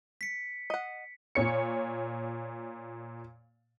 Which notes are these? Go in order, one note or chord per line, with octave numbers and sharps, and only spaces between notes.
B6 C#7
D#5 F#5
A#2 C#5 C#7